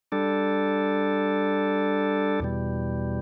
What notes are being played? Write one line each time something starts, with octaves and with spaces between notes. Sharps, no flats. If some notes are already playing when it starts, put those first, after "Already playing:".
G3 D4 A4
E2 B2 G3